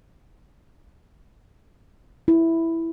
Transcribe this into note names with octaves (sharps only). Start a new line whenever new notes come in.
E4